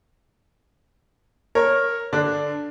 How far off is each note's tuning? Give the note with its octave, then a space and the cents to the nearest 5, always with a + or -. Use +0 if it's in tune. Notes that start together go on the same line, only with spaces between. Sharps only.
A#4 +0 C#5 -15
D3 -5 D4 +0